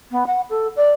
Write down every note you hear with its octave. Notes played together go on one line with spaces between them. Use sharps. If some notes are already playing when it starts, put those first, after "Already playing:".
B3
F#5
A4
D5